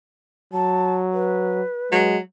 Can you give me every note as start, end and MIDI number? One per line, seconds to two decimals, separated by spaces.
0.53 1.61 54
0.53 0.94 81
1.13 2.08 71
1.92 2.18 54
1.92 2.17 56